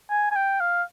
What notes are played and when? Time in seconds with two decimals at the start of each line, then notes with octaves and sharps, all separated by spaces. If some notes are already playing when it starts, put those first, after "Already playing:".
0.10 G#5
0.31 G#5
0.36 G5
0.60 F5